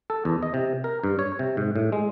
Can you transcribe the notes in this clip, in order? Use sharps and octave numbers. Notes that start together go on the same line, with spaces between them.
A4
E2
D#5
C3
A#4
G2
C#5
C3
G#2
A2
G#3